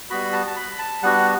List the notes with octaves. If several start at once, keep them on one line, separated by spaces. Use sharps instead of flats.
G3 B3 F#4 B5
A5
A5
B5
A5
G3 B3 D4 F#4 F#5